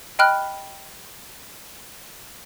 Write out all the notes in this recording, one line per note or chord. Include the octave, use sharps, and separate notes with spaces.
D#5 G5 B5 F6 F#6